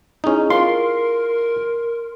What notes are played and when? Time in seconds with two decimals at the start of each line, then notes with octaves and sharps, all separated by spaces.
0.24 C#4 D#4 E4 G#4
0.50 F4 A#4 C6